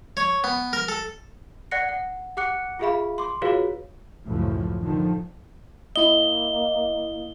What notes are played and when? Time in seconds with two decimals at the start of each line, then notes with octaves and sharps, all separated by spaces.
0.17 C#5
0.44 B3
0.73 A#4
0.88 A4
1.71 D5 F#5 F#6 A#6 C#7
1.89 F#5
2.37 G4 F#5 D6 F#6 C#7
2.79 F4 G4 G#4 E5 F5 B5
3.18 C6 D6
3.42 F4 F#4 G#4 B4 C#5 F5
4.26 C#2 F#2 A2 E3 F3
4.81 D3 D#3 F3
5.96 A#3 E4 D#5 G7